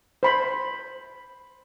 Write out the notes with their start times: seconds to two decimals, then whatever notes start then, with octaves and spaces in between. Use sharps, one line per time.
0.23 C5 B5 C6